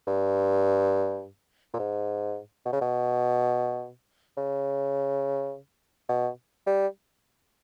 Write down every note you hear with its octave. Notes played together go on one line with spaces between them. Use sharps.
G2
A#2
G#2
B2
C#3
B2
C#3
B2
G3